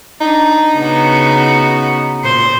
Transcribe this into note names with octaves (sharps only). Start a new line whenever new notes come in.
D4 D#4
C#3 B3 F#4
A#2 C5